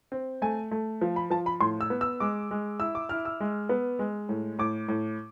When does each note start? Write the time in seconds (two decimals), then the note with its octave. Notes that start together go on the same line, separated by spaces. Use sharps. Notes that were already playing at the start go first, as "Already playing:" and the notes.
0.12 C4
0.42 A3 G#5
0.71 A3
1.01 F3
1.16 B5
1.30 F3 A5
1.46 B5
1.60 A2 C6
1.81 E6
1.90 B3
2.01 E6
2.20 G#3 D6
2.51 G#3
2.80 E4 E6
2.95 D6
3.09 E4 F6
3.25 E6
3.40 G#3
3.69 B3
3.99 G#3
4.29 A2
4.59 A2 D6
4.88 A2